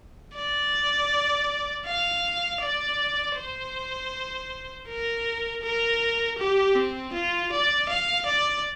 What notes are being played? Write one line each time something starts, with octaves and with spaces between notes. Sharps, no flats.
D5
F5
D5
C5
A#4
A#4
G4
C4
F4
D5
F5
D5